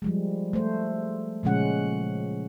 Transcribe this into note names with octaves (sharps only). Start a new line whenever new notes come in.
F3 G3 G#3
A3 C5
A#2 C#3 F3 G#3 C#4 F#5